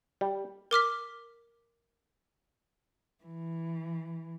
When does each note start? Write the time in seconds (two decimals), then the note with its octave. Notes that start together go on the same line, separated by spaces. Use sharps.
0.21 G3
0.71 A#4 D6 F6 B6
3.24 E3